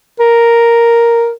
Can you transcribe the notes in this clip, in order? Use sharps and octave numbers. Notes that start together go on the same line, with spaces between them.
A#4